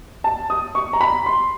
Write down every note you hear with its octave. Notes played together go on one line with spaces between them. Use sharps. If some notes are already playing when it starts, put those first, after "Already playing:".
A5
D#6
C#6
A#5
B5
C6